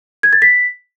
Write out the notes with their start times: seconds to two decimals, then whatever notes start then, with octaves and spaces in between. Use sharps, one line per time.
0.23 G#6
0.33 A6
0.42 B6